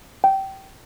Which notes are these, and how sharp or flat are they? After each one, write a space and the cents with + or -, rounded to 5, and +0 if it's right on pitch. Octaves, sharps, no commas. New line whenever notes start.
G5 -20